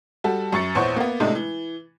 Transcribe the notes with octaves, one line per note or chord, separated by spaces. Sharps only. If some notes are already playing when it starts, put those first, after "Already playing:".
G3 F#4 A4
F#2 C#6 A6 C#7
A#1 E2 C5 C#5 F#5 C#6
A#3 B3
A2 C3 G#3 A3 D4 D#4
E3